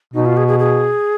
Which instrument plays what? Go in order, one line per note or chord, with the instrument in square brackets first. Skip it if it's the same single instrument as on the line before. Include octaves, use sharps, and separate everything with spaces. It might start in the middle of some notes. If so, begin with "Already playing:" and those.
[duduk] B2 [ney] D#4
[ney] F4
G#4
G#4
G#4